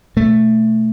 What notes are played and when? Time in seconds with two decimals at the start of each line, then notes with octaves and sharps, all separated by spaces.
0.16 B2 A3